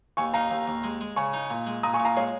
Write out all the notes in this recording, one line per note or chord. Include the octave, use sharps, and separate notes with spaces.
D#2 G#5 C#6
D#4 F5 A#5
D#2
D#2
G#3
G#3
C#3 G#5 C#6
D#4
A#2
G#3
A#2 A#5 D#6
G#5 C#6
A#2
F5 A#5
G#3 C#5 F5